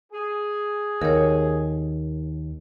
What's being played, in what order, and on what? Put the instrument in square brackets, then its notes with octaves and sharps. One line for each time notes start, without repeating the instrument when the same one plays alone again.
[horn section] G#4
[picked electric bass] D#2 [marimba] A#4 C#5